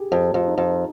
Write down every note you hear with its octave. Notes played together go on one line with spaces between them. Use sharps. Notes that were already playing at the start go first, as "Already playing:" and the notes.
Already playing: G4 G#4
F2 F4
F2
D#4
F2